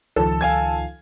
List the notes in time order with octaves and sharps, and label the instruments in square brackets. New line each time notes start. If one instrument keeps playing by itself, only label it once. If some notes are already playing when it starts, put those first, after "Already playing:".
[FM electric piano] C#2 D#3 F3 [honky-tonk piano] A4
[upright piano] F5 G#5 G#6